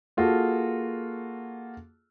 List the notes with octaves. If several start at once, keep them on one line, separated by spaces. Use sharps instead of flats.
A#3 F4 F#4 G#4 A4